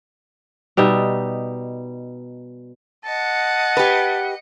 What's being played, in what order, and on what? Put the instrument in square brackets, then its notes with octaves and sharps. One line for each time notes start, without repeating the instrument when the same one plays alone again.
[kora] B2 G3 D#4 E5
[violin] D#5 C#7 [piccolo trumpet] F#5 [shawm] A5
[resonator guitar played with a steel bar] G4 B4